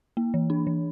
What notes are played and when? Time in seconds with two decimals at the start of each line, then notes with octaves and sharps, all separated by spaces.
0.17 A#3
0.34 E3
0.50 D4
0.67 E3